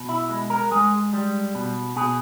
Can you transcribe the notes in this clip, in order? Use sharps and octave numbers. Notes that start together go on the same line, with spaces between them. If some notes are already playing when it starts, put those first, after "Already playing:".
Already playing: B2
E4
G#3
A#4
G#3 G#4
G3
B2
B2 G#4